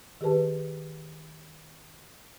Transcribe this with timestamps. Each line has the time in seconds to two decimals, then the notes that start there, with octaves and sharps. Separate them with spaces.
0.21 D#3 G4 G#4 B4 A5